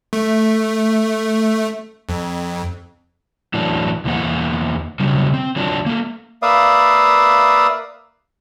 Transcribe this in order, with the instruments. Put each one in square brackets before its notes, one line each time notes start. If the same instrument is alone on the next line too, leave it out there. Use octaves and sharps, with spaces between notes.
[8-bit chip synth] A3
F2
[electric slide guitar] A2 E3 F#3 D4
E2 E3 A#3 C5 F#5
C#3 F#3 G3 D4
C4
D#3 F#3 D4 F4
A3 A#3
[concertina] A#3 B4 D5 E5 F5 D#6